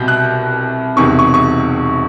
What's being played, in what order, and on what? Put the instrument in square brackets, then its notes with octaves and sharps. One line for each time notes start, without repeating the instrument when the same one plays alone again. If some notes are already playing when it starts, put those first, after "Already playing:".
Already playing: [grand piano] C2 B2 G6
F#6
E1 E2 C3 D#3 C#6
C#6
C#6